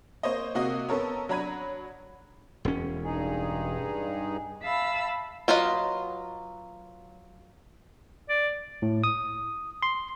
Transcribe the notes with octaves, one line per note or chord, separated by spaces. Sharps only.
A#3 C5 C#5 D#5
C3 A#3 F#4 D#5 D#6
B3 C#4 A4 A#4 C#5
F#3 D4 A#5 B5 G#6 D#7
E1 C#4
G2 D#4 G#4
E5 F5 A5 B5 E6
F#3 F4 B4 D#5
D5
A2
D#6
C6